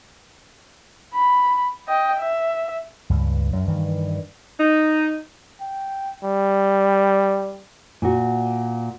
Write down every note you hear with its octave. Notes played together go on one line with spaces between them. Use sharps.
B5
D#5 G5
E5
C#2 G2
F#2
G2 D#3 E3
D#4
G5
G3
A#2 F#4